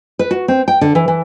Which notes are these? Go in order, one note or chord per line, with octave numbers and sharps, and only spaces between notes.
B4
F#4
C4
G5
D3
E3
E3